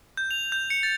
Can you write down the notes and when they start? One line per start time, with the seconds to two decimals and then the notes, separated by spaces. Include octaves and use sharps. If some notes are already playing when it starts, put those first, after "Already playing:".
0.17 G6
0.31 F7
0.52 G6
0.70 C#7
0.83 A6